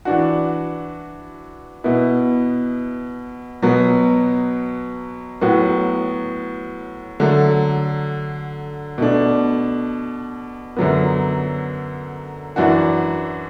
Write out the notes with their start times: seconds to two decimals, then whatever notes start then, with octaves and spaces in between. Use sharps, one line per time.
0.05 E3 D4 F#4
1.84 B2 B3 E4
3.62 B2 F#3 B3
5.41 A2 F#3 B3 F#4
7.20 D3 F#3 A3
8.98 B2 A3 D4
10.77 F#2 D3 F#3 B3
12.56 F#2 E3 D4 F#4